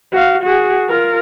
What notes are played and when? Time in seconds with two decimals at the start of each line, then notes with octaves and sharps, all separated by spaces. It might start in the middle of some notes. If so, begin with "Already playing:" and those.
0.12 F#4 F5
0.43 F#4 G#4
0.89 F4 A#4